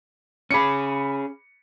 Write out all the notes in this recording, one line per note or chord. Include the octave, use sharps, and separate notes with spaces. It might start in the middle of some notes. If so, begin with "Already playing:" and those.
C#4 G#4 B5 D6 C#7